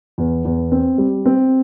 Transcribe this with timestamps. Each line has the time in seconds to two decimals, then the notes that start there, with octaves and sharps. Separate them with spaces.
0.18 E2
0.45 E2
0.72 C4
0.98 G3
1.25 C4